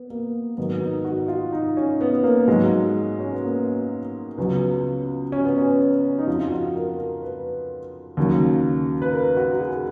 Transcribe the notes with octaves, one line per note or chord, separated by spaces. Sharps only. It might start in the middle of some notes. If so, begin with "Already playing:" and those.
Already playing: B3
A#3
G#2 D#3 F#3 B3
D#4
F#4
F4
D#4
C#4
B3
A#3
G#2 F#3 G#3
C#4
B3
A#3
C#2 C#3 F#3 B3
C#4
B3
C#4
D#4
F2 F3 F4
F4
F#4
A#4
A#4
B4
D#2 C#3 F#3
B4
A#4
F#4
F#4
G#4